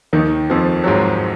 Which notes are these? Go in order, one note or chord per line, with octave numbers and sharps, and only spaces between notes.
D#2 D#3
F2 F3
F#3
G#2 G#3